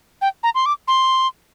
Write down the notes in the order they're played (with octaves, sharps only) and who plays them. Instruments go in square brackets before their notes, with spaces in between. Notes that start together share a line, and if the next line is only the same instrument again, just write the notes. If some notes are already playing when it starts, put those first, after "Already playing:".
[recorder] G5
A#5
C6
D6
C6